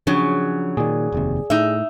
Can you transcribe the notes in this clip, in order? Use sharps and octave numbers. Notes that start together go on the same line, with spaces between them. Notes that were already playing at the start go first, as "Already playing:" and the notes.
C#3 F3 F#3 C#4 D4 G#4
A#2 D#3 G#4 D5
F1 D#2 C3
A2 D#4 E5